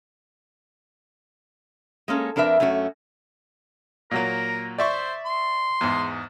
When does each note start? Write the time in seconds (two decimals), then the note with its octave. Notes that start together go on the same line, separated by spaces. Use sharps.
2.08 G#3 A#3 C#4 A4
2.36 F2 D4 A#4 B4 E5
2.60 F#2 A3 C#4 F#4
4.11 A#2 F#3 A#3 A#4
4.78 C5 D5 E5 C#6
5.25 C6
5.81 E2 G#2